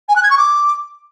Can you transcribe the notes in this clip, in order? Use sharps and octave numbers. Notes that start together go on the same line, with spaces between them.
G#5
F#6
G#6
C#6
D6